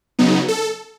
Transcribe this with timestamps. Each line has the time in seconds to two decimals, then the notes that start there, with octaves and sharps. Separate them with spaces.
0.19 C#3 F#3 B3 D#4
0.48 A4